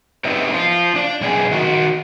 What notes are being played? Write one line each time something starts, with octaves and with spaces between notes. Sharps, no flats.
C3 B3 D#4 E5
F3 F4
D4 D5
F#2 B2 B3 G#4
D#3 F#4